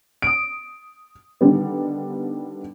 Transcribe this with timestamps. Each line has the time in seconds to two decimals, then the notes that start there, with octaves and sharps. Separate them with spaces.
0.22 D#6 D7
1.41 D3 D#3 G3 B3